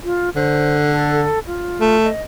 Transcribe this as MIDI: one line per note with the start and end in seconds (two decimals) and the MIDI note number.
0.04 0.30 65
0.36 1.26 50
0.36 0.75 72
0.92 1.39 69
1.47 1.97 65
1.80 2.08 57
2.04 2.22 75